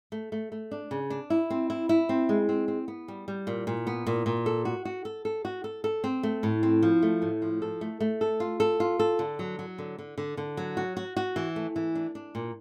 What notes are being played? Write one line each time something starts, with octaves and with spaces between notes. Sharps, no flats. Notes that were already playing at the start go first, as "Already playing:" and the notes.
A3
A3
A3
D4
C#3
D4
E4
C4
E4
E4
C4
G#3
C4
C4
B3
G3
G3
A#2
A#2
B3
A#2
A#2
A4
F#4
F#4
A4
A4
F#4
A4
A4
C4
A3
A2
C4
F3
A3
A2
F3
A4
A3
A3
A4
F4
A4
F4
A4
D3
F#3
F#3
D3
D3
D3
D3
F#3
F#4
F#4
F#4
E3
A3
E3
D4
D4
A#2